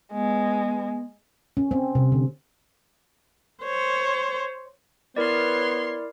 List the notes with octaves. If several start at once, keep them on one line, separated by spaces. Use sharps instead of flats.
G#3 B3
C#4
C4
C3
D3
C5 C#5
B3 E4 A#4 C#5 D5 C6